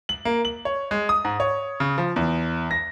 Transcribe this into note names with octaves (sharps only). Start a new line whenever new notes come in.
F#7
A#3
F#7
C#5
G#3
D#6
G#2
C#5
C#3
F3
E2
A#6